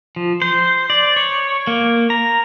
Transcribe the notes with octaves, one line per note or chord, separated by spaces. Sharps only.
F3
C5
D5
C#5
A#3
A#5